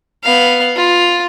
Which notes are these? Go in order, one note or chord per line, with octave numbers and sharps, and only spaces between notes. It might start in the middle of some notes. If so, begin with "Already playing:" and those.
B3 F5
F4